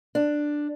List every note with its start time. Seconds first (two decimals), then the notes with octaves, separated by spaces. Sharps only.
0.15 D4